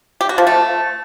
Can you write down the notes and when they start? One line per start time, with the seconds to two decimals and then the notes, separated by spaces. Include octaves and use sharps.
0.21 G4
0.29 F#4
0.38 F3
0.47 A3